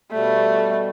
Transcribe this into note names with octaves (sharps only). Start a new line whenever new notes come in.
B2 G3 A3